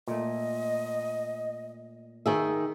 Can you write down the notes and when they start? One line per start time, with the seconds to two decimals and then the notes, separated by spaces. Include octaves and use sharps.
0.08 A#2 A3 D#5
2.26 D#3 G#4 E5